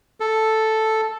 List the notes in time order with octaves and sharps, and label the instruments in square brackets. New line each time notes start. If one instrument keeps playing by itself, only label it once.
[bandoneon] A4